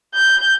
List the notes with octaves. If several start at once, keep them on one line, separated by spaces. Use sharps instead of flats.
G6